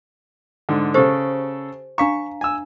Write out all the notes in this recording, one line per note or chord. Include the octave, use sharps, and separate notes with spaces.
G#2 D3
C#3 G4 A4 C5
D4 F5 A#5 C#6
G#5 E6